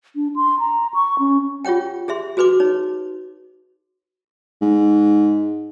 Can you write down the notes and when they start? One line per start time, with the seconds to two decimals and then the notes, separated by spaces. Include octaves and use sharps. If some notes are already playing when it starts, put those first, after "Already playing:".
0.16 D4
0.36 C6
0.60 A#5
0.94 C#6
1.19 C#4
1.65 F4 G4 C#5 F#5 G5
2.08 G4 G#4 E5 C6
2.37 F#4 G#4 B4 C6 D6
2.60 D#4 C#5
4.61 G#2